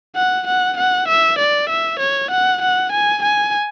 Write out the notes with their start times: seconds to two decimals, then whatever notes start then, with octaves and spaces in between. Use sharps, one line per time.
0.16 F#5
0.47 F#5
0.78 F#5
1.08 E5
1.39 D5
1.70 E5
2.00 C#5
2.31 F#5
2.62 F#5
2.92 G#5
3.23 G#5